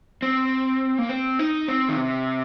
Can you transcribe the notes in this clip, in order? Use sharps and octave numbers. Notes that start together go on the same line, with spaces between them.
C4
A#3
C4
D#4
C4
D#3
C3